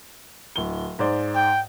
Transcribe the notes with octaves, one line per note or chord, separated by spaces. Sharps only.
D1 G7
G#2 C5 D5
G5